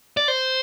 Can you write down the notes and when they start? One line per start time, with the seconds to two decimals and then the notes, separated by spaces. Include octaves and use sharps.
0.17 D5
0.28 C5